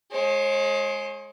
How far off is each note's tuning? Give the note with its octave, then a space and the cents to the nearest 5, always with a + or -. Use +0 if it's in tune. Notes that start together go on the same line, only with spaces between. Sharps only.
G#3 +15 C#5 -45